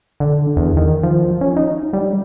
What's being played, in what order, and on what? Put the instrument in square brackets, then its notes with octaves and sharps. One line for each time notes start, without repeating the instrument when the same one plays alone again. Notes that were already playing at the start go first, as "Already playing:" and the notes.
[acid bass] D3
E2
D#3
F3
C#4
D#4
G3